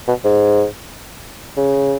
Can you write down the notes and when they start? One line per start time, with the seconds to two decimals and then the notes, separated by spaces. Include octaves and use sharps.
0.08 B2
0.25 G#2
1.57 C#3